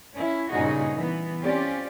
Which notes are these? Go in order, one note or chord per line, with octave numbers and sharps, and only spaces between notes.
C#4 E4
G2 A#2 C#3 D#4 F#4 G#4
E3 B3
C4 C#4 F4 G4 D5